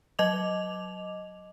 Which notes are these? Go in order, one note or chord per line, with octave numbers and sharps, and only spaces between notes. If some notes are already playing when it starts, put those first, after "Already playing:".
F#3 D#5 D6 F7